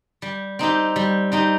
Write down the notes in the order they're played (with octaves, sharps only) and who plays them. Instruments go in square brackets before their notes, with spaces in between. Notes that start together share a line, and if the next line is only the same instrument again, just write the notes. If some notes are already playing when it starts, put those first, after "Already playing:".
[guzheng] G3
C4 D#4 G4
G3
C4 D#4 G4